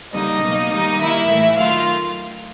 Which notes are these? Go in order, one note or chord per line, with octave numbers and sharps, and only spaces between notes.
D3 G3 A#3 D#4 D#5
B2 F#3 A#3
D#3 G3 A#3 D#4 D#5
D#3 G3 A#3 E4 E5
A2 E3 A3
D#3 F#3 A3 F4 F5